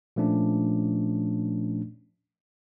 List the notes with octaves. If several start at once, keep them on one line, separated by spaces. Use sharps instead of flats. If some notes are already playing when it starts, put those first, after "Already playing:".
A#2 F3 A3 C#4 D4